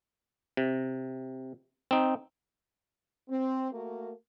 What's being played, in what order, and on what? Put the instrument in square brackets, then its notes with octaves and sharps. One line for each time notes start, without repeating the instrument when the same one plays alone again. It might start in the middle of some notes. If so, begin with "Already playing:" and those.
[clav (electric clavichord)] C3
C4 D#4
[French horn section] C4
A3 A#3 F#4 A#4